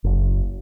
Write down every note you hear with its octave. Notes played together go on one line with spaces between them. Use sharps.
F#1